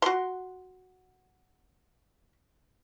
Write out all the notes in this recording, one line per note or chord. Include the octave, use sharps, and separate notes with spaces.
F#4 C6